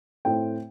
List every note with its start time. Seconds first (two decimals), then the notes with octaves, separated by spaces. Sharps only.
0.25 A2 A3 C4 G5